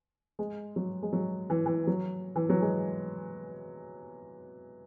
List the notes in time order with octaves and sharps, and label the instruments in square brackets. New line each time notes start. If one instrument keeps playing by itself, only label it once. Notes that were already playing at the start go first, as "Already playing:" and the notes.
[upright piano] G#3
F#3
G#3
F#3
E3
E3
F#3
E3
F#3
G#3